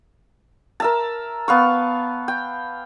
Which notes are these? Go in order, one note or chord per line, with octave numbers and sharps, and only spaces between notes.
A#4 E5 A5
B3 F5 C#6
G5